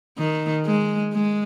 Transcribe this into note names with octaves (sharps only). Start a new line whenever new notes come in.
D#3
G#3
G#3